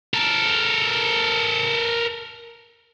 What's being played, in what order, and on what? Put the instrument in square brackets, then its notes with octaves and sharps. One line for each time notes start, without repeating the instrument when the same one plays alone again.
[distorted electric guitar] A4 A#4